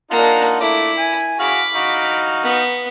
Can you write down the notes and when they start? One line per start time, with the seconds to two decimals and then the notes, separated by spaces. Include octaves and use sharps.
0.11 A#3 D4 D#4 F4 F#5
0.60 A3 E4 D6
0.98 G#5
1.39 F#4 G#4 F5 B5 D6
1.75 D#4 F#4 F5
2.43 B3